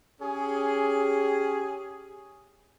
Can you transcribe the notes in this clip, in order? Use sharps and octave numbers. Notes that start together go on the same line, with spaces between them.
C#4 G4 G#4